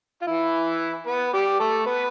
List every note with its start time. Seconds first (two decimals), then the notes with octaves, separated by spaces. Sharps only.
0.22 F4
0.27 E3 E4
1.07 B3 B4
1.33 G3 G4
1.60 A3 A4
1.86 B3 B4